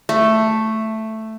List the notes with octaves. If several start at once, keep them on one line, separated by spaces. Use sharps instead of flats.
A3